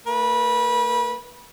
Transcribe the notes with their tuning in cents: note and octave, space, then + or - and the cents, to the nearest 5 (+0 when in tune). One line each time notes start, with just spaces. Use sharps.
A3 +45 B4 -25